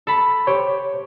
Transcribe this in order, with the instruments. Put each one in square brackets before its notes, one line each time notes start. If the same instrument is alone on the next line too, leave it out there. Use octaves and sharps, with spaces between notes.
[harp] A4 B5
[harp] G4 [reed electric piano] C5 C#5